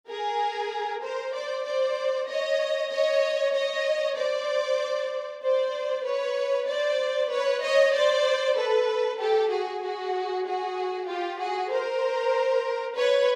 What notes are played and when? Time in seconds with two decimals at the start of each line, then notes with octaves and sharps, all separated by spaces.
0.08 G#4 A#4
1.02 A#4 C5
1.34 C5 D5
1.65 C5 D5
2.28 C#5 D#5
2.91 C#5 D#5
3.54 C#5 D#5
4.17 C5 D5
5.43 C5 D5
6.05 B4 C#5
6.68 C5 D5
7.31 B4 C#5
7.63 C#5 D#5
7.94 C5 D5
8.56 A4 B4
9.19 G4 A4
9.51 F#4 G#4
9.82 F#4 G#4
10.46 F#4 G#4
11.08 F4 G4
11.39 F#4 G#4
11.71 A#4 C5
12.96 B4 C#5